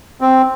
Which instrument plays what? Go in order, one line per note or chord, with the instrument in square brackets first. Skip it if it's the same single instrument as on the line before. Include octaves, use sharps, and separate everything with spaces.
[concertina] C4